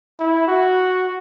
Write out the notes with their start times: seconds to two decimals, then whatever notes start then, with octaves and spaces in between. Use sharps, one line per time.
0.20 E4
0.48 F#4